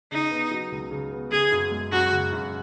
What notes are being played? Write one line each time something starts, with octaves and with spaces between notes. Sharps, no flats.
C#3 D#4
B3
F#3
C#2
C#3
B3
C#3 G#4
F#2
G#3
F#2 F#4
C#3
F#2